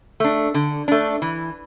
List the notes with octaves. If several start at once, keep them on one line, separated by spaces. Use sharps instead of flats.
A3 D4
D3
A3 D4
E3